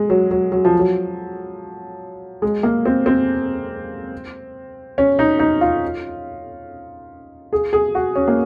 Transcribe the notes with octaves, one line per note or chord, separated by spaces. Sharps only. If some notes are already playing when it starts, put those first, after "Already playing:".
Already playing: G#3
F#3
F#3
F#3
F3
F#3
G#3
A#3
C4
C4
C#4
D#4
D#4
F4
G#4
G#4
F#4
C#4
A#3